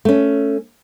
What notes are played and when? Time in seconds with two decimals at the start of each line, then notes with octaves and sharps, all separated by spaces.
0.05 A3 C#4